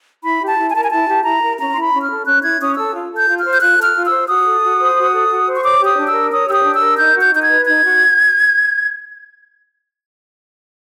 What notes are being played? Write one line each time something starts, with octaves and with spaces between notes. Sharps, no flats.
E4 B5
G4
A5
E4
G#5
A#4 A5
G#5
E4 A5
G4
E4 A#5
A#4
C#4 A#5
E4 C6
B5
C#4
F6
A4
C#4 F#6
E4 G#6
C#4 D#6
A4 E6
F4
A4 G6
F4
F6
C5
G6
F4 F#6
A4 F6
F4
E6
C5
F#4 D#6
A4
F#4
C5
F#4
A4
F#4
C5
C#6
C#5 D6
G4 D#6
D4
E6
A#4
C#5 D#6
G4 E6
D#6
D4
A#4 E6
D#4 G6
F#4
G6
D#4 G6
G#6
B4
D#4 G#6
F#4